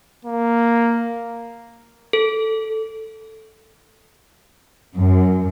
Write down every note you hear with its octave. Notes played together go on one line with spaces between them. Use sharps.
A#3
A4
F#2